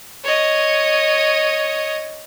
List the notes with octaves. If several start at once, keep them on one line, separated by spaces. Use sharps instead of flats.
C#5 D#5